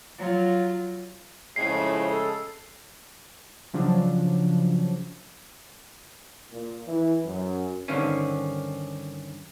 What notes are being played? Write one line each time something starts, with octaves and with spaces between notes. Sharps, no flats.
F#3 F4
F2 A2 C#3 G#3 C7
A4
C#3 F3 F#3 D4
A#2
E3
F#2
G2 D3 D#3 C4 C#4